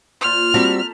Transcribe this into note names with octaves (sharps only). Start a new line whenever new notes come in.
A#2 C5 F6
G3 C4 F#4 A4 A#5 B5